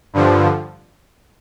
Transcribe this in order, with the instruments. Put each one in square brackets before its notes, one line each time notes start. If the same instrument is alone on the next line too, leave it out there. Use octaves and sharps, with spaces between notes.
[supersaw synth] G2 D3 F3